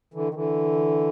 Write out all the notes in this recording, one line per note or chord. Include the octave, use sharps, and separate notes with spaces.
D3 E3
D#3
D3 E3